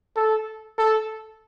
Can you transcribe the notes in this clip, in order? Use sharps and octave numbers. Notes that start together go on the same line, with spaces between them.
A4
A4